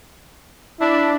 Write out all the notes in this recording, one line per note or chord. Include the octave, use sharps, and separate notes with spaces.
D4 E4